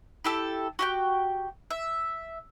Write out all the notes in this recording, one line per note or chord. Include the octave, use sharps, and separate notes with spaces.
E4 G4 A4
F#4 G4 G5
E5